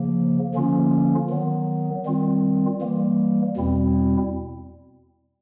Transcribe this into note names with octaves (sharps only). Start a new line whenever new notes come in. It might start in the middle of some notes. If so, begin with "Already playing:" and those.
Already playing: C#3 F3 A#3
D3 F3 A#3 C#4 F4
D#3 F#3 B3
D#3 G3 C4 F4
E3 G3 A#3
E2 B2 G3 C4 E4